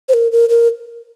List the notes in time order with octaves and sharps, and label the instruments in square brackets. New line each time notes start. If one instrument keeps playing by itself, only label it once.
[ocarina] C5
A#4
A#4
A#4